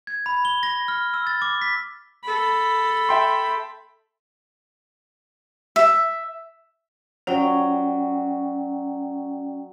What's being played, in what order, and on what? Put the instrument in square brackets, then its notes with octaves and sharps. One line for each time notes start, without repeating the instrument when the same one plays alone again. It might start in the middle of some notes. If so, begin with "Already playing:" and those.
[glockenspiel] G#6
B5
G7
A#6
F6
E6
A6
D6
B6
[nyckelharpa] A4 B5
[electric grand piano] E5 G5 C6
[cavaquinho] E5
[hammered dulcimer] F#3 [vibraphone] C#4 D5 G5